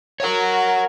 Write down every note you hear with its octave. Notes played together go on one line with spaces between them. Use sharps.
F#4 A#4 C#5 F#5